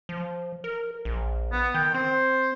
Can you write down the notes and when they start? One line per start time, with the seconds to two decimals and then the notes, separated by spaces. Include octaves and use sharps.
0.09 F3
0.64 A#4
1.05 A#1
1.52 B3
1.74 D#3 G5
1.94 C4 C5